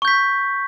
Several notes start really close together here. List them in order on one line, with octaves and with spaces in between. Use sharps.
C#6 G6 B6